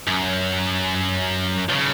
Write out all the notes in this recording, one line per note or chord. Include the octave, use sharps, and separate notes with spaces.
F#2
B1 C#3